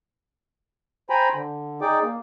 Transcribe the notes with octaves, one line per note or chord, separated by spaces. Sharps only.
C5 G5 G#5 A#5 B5
D3
D#4 G#4 D5 G5 D6
A#3